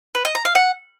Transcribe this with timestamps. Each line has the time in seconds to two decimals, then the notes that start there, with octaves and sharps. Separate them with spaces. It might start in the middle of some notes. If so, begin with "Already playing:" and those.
0.15 B4
0.25 D#5
0.35 A#5
0.45 F5
0.55 F#5